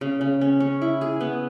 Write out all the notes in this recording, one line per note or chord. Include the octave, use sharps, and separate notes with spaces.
C#3
C#3
C#4
C#4
E4
G#4
B3